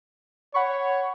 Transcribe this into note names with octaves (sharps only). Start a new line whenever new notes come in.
C#5 F#5 B5 C#6